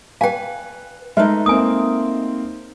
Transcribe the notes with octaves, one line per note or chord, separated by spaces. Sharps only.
B4 F5 G5 G#5
G#3 A3 D#4 A#4 B4 E5
A#3 C4 G#5 D#6